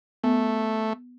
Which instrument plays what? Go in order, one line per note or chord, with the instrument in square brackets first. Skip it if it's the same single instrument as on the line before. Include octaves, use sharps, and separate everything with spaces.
[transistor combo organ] A3 [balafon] B3